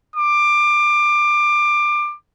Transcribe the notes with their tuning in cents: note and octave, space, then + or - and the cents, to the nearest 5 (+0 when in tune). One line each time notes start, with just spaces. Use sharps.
D6 +20